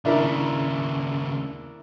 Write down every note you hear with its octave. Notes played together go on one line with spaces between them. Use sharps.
D#2 C#3 D4 E4 A#4